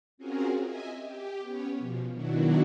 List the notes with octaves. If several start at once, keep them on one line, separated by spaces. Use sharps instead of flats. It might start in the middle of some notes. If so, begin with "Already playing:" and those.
C4 C#4 F4 F#4 G#4 A#4
D#5 E5 G#5
G4
B3 C#4 C#5
B2 F3
B2 D#3 F#3 D4 E4 F#4